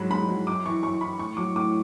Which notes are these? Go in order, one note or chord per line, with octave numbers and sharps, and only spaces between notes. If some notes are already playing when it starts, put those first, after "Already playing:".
Already playing: G#2 F#3 B5
G#2 B5
F#3
F#2 D6
E3 C#6
F#2 C#6
E3 B5
A2 C#6
F#3 D6
A2 D6